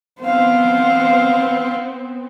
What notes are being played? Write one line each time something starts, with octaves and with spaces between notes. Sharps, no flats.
B3 C4 C5 F5